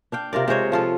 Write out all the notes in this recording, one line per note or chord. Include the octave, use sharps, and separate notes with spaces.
D4 F5 G5
C3 F4 A#4 D5
C3 G#3 C5 C#5
F3 F4 A4